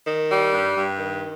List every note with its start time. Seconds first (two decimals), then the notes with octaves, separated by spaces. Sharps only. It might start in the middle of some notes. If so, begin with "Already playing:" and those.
0.07 D#3
0.30 G3
0.53 G2
0.76 G2
0.99 D#3